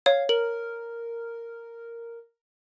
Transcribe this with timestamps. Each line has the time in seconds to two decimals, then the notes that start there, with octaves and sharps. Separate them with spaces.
0.06 C#5 F5
0.29 A#4 F#7